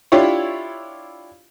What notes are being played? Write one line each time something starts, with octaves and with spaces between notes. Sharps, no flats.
D4 E4 F4 G4 C#5